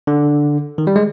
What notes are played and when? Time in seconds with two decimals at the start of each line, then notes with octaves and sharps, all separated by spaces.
0.07 D3
0.78 D#3
0.87 G3
0.96 G#3